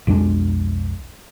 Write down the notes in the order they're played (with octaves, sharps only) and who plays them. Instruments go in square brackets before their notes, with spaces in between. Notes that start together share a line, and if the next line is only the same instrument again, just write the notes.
[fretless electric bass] B1 F2 G#3 D4